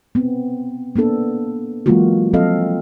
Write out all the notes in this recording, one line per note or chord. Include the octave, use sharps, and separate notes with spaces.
B3 C4
A#3 B3 D4 A4
E3 F#3 G#3 A#3 F4 F#4
F3 F#3 C4 A4 D#5 F5